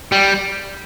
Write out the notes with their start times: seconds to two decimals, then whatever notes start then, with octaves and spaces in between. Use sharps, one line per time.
0.12 G3